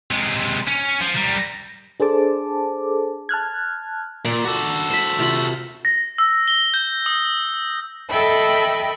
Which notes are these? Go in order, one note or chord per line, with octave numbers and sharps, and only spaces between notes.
C3 G#3
C#4
F3
G3 A#4
D4 G#4 A4 C5 A5 D6
A5 F6 F#6 G#6
A#2 D5
F#4 A4
C5 B5
C3 F4 B5
A#6
E6
G7
G6
D#6
A4 D#5 E5 G5 B5